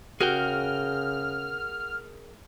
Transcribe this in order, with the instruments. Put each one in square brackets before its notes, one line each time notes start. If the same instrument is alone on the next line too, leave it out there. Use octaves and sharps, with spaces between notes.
[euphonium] C#3 [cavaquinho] F#4 [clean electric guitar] G#4 A#4 G5 [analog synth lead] F6